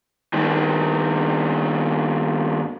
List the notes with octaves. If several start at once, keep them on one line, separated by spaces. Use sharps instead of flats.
G2 D#3